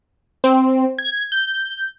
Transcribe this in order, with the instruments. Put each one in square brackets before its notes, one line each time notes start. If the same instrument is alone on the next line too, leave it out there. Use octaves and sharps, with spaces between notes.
[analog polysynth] C4
G#6
G6